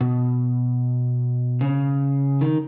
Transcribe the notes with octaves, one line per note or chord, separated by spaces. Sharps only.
B2
C#3
D#3